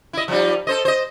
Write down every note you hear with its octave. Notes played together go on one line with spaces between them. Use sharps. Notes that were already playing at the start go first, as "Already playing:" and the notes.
E4 D#5
F3 G3 D#4
A4 C5 D#5
C5 D#5